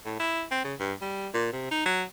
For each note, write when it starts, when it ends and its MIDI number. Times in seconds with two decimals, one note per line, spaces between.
0.05 0.16 45
0.19 0.43 64
0.51 0.63 60
0.64 0.74 49
0.80 0.93 43
1.01 1.28 55
1.34 1.49 46
1.53 1.68 48
1.71 1.83 63
1.85 2.03 54